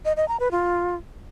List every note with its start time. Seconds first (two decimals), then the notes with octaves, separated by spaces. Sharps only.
0.05 D#5
0.17 D#5
0.28 A#5
0.40 B4
0.51 F4